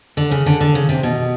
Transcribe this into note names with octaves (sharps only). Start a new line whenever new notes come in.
D3
C#3
D3
D3
C#3
C3
B2